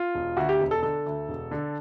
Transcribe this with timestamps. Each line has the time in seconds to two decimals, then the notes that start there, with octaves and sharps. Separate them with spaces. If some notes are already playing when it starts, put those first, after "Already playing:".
Already playing: F4
0.15 E1
0.37 D2 F#4
0.49 G4
0.61 E1
0.71 A4
0.83 D3 A4
1.06 D2
1.29 E1
1.51 D3